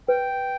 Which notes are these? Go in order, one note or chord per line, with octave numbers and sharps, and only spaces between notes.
B4 G5